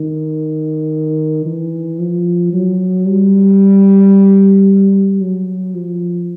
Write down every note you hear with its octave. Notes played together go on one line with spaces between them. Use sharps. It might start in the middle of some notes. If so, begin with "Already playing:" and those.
Already playing: D#3
E3
F3
F#3
G3
F#3
F3